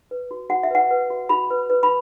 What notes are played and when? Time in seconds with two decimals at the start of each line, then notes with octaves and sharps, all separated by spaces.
0.11 B4
0.31 F#4
0.50 F#4 F#5
0.63 E5
0.71 B4 F#5
0.91 B4
1.10 F#4
1.29 F#4 B5
1.50 B4
1.70 B4
1.83 B5